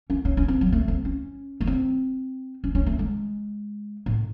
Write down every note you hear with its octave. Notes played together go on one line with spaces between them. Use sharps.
C#4
C#4
C#4
C4
F#3
A3
C4
C#4
A3
C4
C#4
C#4
A3
G#3
A2